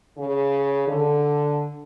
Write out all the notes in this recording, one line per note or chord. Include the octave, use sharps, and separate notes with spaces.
C#3
D3